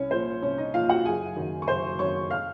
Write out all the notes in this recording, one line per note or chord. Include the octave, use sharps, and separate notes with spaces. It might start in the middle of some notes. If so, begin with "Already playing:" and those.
Already playing: C2 C#4 C#5
A#2 F3 C5
C2 C#4 C#5
D#4 D#5
A#2 F3 F4 F5
F#4 F#5
F#1 G#4 G#5
F#2 D#3
C#6
F#1 C5 C6
F#2 D#3 C#5 C#6
F5 F6